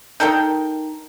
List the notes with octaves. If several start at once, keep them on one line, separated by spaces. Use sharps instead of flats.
D#4 A4 A#4 G5